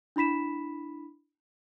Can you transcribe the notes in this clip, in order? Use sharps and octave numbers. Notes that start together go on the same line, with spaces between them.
D4 E4 B5 B6 E7